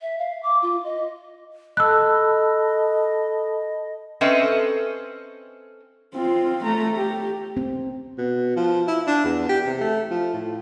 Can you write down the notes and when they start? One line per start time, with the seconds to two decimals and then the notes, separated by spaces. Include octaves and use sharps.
0.02 E5
0.19 F5
0.43 D6
0.62 F4
0.84 D#5
1.77 A4 D#5 A5 B5 E6 F#6
4.21 C4 C#4 A4 B4 D#5 E5
6.14 C4 F4
6.65 A3 A#5
6.96 G4
7.57 C4
8.18 B2
8.56 F3
8.87 E4
9.07 D4
9.24 E2
9.49 G4
9.66 C3
9.81 A3
10.10 F3
10.33 A2